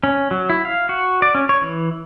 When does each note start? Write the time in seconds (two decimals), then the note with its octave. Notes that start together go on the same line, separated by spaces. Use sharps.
0.03 C#4
0.31 F#3
0.50 E4
0.65 F5
0.89 F#4
1.22 D5
1.35 C#4
1.49 C#5
1.61 E3